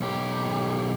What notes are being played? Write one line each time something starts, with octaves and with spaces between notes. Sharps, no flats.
B1 G4